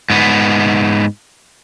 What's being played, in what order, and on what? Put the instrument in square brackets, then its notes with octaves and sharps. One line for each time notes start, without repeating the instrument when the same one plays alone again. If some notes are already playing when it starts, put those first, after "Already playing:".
[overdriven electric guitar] G#2 B3